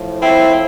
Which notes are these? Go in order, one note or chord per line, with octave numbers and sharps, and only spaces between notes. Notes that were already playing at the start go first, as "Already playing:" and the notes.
Already playing: A2 F3
C4 E4